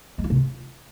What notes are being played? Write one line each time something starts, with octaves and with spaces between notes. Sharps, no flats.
G#3
F4
C3
F4